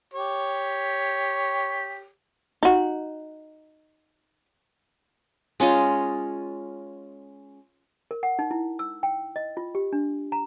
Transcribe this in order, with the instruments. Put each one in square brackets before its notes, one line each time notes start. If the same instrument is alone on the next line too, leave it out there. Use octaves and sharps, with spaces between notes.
[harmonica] G4 C#5
[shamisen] D#4 F#4
[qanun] G#3 C#4 F4 D#5
[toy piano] A#4
F#5
D#4
E4
E6
G5
D#5
F4
G4
D4
A#5